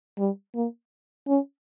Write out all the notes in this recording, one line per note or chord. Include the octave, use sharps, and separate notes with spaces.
G3
A#3
C#4